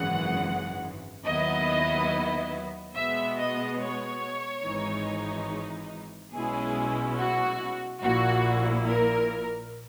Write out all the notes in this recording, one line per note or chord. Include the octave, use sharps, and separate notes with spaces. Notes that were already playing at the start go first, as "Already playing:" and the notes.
Already playing: G#1 F#2 C#3 E3 G#3 F#5
D#2 D#3 F#3 B3 E4 D#5
B2 G#3 B3 E5
D#5
C#5
G#1 G#2 E3 G#3 D#4
B1 B2 G#3 C#4 E4 G#4
F#4
A#1 A#2 A#3 E4 F#4
A#4